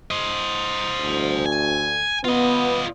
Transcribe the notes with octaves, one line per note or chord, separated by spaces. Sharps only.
C5 D#5
D2
G#5
B3 F4 D#5